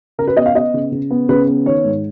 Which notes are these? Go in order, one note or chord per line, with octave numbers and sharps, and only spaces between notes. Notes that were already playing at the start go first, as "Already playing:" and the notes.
C#3 A#4
B4
B3 D#5
F5
B3 D#5
C#3
C#3
B3
C#3 B4
B3
D#3 C#5
G#2